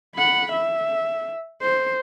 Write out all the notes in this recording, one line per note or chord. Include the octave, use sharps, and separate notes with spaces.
F#5 B5
E5
C5